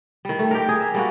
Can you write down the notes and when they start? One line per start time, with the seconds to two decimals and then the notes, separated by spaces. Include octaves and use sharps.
0.25 D#3 G3
0.39 A3
0.51 G4 A#4
0.69 G#4
0.81 E5
0.94 G3 A#3 F#4